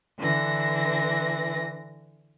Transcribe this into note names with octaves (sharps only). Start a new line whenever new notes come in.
D3 E3 A#6